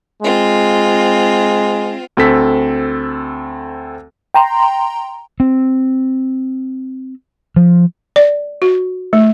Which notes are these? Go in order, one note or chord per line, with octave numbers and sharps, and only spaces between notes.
G#3 C4 F4
D2 C4 A4 B6
G5 A#5 C6
C4
F3
D5
F#4
A3